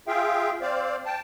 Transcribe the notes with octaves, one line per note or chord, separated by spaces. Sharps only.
F4 G#4 E5 F5 G5
C4 C5 D5 F5
G5 A5